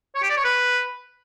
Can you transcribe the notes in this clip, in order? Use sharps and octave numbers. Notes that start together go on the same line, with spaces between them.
C#5
G4
D5
C#5
B4